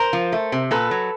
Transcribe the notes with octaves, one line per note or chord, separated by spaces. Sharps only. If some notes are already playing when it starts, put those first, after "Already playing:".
Already playing: A#4 C5
F3
A3
C3
A#2 A4 B4
F#3